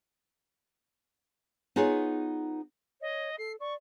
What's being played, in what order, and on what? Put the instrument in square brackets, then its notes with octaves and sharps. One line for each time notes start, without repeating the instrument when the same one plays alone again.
[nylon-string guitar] B3 D#4 F4 G#4 B4 C#5
[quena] C#5 [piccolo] D#5
[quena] A4 [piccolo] C7
[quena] D5 [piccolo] C#6